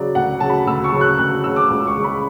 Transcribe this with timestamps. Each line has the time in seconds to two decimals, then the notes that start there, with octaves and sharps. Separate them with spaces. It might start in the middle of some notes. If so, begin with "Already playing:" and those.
Already playing: C#3 F#3 D5
0.15 D2 F#5
0.40 C#3 F#3 A5
0.50 B5
0.66 D2 E6
0.84 C#6
0.92 C#3 F#3
1.01 F#6
1.18 D2 F#6
1.44 C#3 F#3 E6
1.56 D6
1.70 C#2 D6
1.87 C#6
1.95 C#3 G#3 C#4
2.04 B5